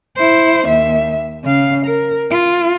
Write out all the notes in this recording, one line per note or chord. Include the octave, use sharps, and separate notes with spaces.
E4 C5
D#2 E5
C#3 F5
A#4
F4